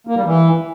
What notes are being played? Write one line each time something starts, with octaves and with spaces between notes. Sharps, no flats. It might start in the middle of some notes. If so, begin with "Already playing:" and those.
A#3
G3
E3